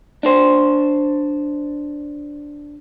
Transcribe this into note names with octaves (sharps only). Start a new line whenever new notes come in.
D4 C5